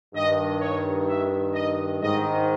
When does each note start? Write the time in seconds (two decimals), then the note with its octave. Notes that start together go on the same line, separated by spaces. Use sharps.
0.15 G2 D#3 D#5
0.61 C#5
1.09 E5
1.55 D#5
2.02 G#2 D#3 D#5